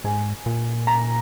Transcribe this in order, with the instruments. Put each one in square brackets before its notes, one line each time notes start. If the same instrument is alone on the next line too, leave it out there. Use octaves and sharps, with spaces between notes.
[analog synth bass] G#2 [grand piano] G#5
[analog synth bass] A#2
[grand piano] A#5